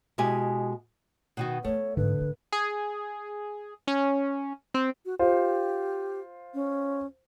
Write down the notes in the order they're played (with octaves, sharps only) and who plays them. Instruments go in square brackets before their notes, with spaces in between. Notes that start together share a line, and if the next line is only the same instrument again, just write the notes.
[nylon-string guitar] B2 G#3 E4 G4 G#5
B2 D#3 F#4
[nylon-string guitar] A3 [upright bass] B3 F4 [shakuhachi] C#5
[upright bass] G#2 C4 [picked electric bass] D3 [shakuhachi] B4
[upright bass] G#1 D#3
[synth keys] G#4
C#4
C4
[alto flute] F#4
[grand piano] F4 C5 [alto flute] G4
[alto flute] C#4